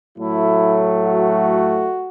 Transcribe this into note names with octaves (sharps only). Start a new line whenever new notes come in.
A2 F#3 A3 E4
F#4